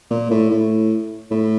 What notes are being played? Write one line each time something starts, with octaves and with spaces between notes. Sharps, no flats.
A#2
A2
A2
A2